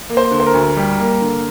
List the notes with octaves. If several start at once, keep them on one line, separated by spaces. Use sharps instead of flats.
A#3
C5
D3
C5
A#4
D2
G3
A#3
D3